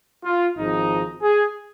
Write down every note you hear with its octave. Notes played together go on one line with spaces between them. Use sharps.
F4
G#1 G#2 F3 D#4
G#4